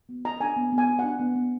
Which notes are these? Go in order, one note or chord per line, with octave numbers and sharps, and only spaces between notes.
B3
F4 A#5
D4 G#5
B3
B3
G#5
F4
D4 F#5
B3
B3